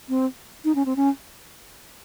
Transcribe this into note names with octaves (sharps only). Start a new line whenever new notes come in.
C4
D#4
C#4
C4
C#4